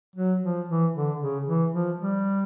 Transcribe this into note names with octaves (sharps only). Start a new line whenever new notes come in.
F#3
F3
E3
D3
C#3
E3
F3
G3